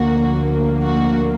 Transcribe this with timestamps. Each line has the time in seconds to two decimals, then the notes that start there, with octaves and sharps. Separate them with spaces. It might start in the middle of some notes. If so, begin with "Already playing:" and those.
Already playing: D2 D3 F3 A#3 F#4
0.82 F#4